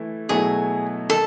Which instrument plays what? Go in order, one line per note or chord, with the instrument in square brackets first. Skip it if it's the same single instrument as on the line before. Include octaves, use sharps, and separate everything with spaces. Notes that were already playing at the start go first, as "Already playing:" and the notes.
Already playing: [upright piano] E3 A3 E4
[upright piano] B2 F#3 A3 E4 A4 [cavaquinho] G#4
[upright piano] D#3 [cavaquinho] A4